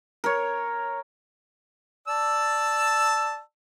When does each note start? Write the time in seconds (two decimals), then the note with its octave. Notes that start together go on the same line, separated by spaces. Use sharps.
0.24 A#4 C#5
2.08 D5 A5 E6